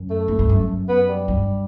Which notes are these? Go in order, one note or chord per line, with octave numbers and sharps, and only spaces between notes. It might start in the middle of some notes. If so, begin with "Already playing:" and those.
Already playing: F#2
A3
A2
G2
F#2
B3
G3
G2